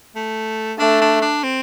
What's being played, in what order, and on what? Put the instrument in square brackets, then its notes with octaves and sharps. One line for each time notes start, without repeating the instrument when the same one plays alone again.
[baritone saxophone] A3
[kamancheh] A3 [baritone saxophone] D4
[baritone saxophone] D4
D4
C4